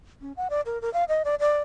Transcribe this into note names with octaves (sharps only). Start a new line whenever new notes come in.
C#4
F#5
D5
A#4
A#4
F5
D#5
D5
D5